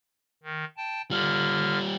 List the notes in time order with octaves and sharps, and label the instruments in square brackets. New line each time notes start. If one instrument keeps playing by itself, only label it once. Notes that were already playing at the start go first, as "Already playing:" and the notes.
[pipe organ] D#3
G5 A5
[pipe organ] D3 F6 [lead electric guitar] G3 F4